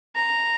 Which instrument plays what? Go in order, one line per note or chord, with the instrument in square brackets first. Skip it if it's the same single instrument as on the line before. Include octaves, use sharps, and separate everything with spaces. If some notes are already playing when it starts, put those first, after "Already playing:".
[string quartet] A#5